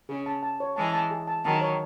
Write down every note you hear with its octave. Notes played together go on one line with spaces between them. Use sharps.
C#3 G#4
A5
A5
C#5
E3 G#3 A5
A5
G#4
A5
D#3 F#3 A5
C#5